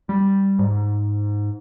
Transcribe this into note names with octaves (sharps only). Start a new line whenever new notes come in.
G3
G#2